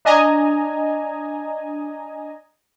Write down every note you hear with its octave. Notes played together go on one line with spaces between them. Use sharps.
D4 D#5 G#5 A#5